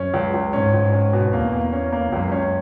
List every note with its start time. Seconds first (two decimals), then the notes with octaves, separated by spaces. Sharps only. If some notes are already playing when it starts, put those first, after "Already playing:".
Already playing: F#2 C#4
0.14 C#2
0.34 C#2
0.53 G#2 C#4
0.74 C#2
0.93 C#4
1.13 B2
1.33 E2 A#3
1.53 A#3
1.73 C#4
1.93 A#3
2.12 C#2 F#2
2.32 C#4